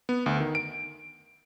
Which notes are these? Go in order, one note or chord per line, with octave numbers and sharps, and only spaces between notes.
B3
D2
D#3
D7